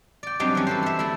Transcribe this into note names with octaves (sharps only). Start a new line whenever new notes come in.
D5 G5
F#3 G3 C4 D4 D#4 G4
E3 C#4
A4 B4 C5
C5 E5
A3 E4